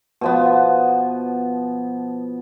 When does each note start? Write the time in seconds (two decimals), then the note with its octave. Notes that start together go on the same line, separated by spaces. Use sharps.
0.21 B2 F3 B3